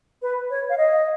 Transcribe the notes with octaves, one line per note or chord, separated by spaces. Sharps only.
B4
C#5
F5
D#5